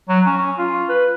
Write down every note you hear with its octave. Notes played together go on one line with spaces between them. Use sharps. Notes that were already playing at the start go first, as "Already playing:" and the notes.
F#3
C#4
C#4
F4
B4